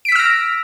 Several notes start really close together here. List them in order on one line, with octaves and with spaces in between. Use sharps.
D7 B6 E6 F6 A#6